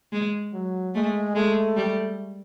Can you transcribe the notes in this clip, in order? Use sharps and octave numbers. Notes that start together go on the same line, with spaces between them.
G#3
F#3
G#3 A3
G#3 A3
G3